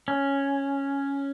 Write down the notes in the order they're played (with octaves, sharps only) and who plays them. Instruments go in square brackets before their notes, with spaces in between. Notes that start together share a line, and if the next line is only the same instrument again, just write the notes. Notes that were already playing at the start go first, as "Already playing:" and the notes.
[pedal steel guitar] C#4